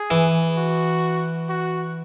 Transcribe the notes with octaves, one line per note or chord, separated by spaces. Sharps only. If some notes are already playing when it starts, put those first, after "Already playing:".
Already playing: G#4
E3
F#4
F#4